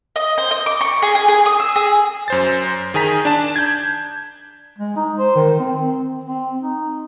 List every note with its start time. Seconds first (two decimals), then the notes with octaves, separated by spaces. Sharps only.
0.16 D#5
0.38 C5
0.51 D#5
0.66 D6
0.81 C#6
1.02 G#4
1.15 G#4
1.28 G#4
1.46 D#6
1.60 E6
1.76 G#4
2.28 F#2 C5 A6
2.94 D#3 G#4 G#5 A#5 B6
3.25 D4 A5
3.56 G6 G#6
4.78 G#3
4.96 D#4
5.19 C5
5.36 D#3
5.59 C4
6.24 C4
6.61 D#4